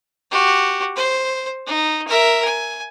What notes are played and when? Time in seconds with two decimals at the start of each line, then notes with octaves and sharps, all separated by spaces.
0.31 F#4 G4
0.96 C5
1.67 D#4
2.07 A#4 E5
2.45 G#5